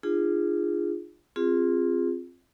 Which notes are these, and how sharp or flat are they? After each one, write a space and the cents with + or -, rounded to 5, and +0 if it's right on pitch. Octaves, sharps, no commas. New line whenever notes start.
D4 +35 F4 -10 G#4 -10
C4 +15 F4 +0 G#4 -20